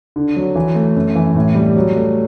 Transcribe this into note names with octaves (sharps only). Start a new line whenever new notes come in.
D3
F#3
E3
A3
F#2
E3
A2
G3
F#3
A3